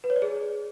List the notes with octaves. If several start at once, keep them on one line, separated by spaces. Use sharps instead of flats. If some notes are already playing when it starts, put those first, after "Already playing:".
B4
C#5
D5
G#4